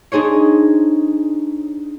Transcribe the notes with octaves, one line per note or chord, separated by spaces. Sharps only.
D4 D#4 G#4 C5 C#5